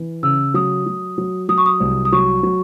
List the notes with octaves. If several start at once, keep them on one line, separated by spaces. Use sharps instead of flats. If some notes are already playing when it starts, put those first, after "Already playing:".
Already playing: E3
C#3 E6
F#3 D#6
F#3
F#3
F#3 D#6
C#6
D#6
C2
D#6
F#3 C#6
F#3